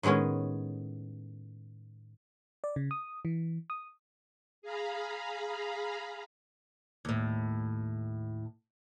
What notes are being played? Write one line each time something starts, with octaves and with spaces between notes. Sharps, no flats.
A2 D#3 G#3 B3 C#4
D5
C#3
D#6
E3
D#6
G#4 F5 A#5 B5
D#2 A2